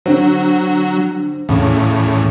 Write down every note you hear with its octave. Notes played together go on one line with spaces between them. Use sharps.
D3 F#3 C4
E2 A2 C#3